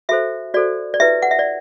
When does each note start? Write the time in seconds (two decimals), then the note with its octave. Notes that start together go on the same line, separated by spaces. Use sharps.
0.09 F#4 A4 C5 E5
0.54 F#4 A4 C5 D5
0.94 D5
1.00 E4 G4 B4 E5
1.22 F#5
1.31 E5
1.39 D5